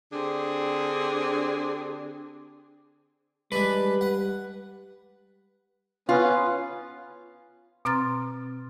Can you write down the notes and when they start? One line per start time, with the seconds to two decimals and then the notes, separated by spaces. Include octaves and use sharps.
0.13 D3 C4 D4 G4 G#4
3.52 G3 G#3 D4 B4
4.01 F#5
6.09 B3 C#4 F4
7.85 B2 C4 A#5 C6 F6 A6